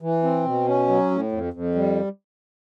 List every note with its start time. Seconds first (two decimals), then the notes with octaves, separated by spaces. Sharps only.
0.02 E3
0.23 C4
0.45 B2
0.67 C#4
0.88 F#3
1.11 A2
1.32 F2
1.53 F2
1.75 G3